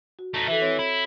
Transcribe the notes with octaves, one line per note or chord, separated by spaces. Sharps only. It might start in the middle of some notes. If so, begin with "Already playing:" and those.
F#4
A3 D#4
E3 A4 E5
C4 C#5
E4